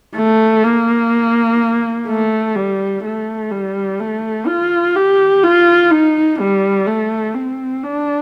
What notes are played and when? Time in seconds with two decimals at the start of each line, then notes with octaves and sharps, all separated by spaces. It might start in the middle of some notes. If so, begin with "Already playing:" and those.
0.16 A3
0.64 A#3
2.08 A3
2.56 G3
3.04 A3
3.51 G3
3.99 A3
4.47 F4
4.95 G4
5.43 F4
5.91 D#4
6.40 G3
6.87 A3
7.34 C4
7.83 D4